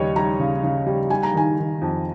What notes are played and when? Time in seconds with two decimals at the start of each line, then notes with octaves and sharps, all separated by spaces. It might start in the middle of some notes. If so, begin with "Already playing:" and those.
Already playing: D#2 C#3 G3 C#5 D#5
0.16 G3 A#5
0.40 C#3
0.63 C#3
0.86 G3
1.10 G3 G#5
1.23 A#5
1.34 D#3 G#5
1.58 D#3
1.81 F2